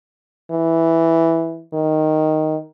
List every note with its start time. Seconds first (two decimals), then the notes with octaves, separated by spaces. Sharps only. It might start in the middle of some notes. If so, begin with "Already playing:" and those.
0.51 E3
1.73 D#3